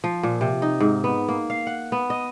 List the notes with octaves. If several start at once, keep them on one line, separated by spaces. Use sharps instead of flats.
F3
A#2
C3
D#4
G#2
B3
A#3
F5
F#5
B3
D#5